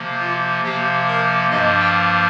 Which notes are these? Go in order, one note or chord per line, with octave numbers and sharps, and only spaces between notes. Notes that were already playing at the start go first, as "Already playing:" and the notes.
Already playing: C3 F3 A#3
F4
C3 F3 A#3 G4
A#4
G2 F3 A#3 D#5
G5